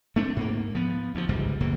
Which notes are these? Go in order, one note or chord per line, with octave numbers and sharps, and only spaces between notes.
A3 C4 D4
G#2 A#3
F3 B3
D2 F3
G1 C#2 G#2 G3
E1 C#2 F#2 A#3